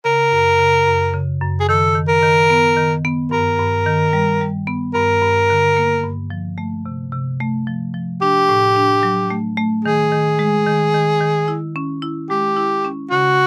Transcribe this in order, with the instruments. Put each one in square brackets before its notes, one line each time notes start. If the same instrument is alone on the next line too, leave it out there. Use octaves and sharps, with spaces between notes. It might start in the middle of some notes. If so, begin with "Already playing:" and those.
[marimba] C#3 [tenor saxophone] A#4
[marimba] F#2
C#3
F#2
C#3
F#2
[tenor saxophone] G#4
[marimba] D#3 [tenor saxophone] A4
[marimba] D#3
[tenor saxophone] A#4
[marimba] D#3
B3
D#3
B3
[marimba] G2 [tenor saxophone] A#4
[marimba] G2
D#3
G3
G3
B3
[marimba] G2 [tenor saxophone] A#4
[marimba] G2
D3
A#3
G2
F3
A3
C3
C3
A3
F3
F3
[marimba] D4 [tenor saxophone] G4
[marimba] A2
D4
F#3
A3
A3
[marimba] D#3 [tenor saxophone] G#4
[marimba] D#3
G#3
D#3
D#3
D#3
E4
C#4
E4
[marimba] G#3 [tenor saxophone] G4
[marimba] E4
C#4
[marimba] C#3 [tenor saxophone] F#4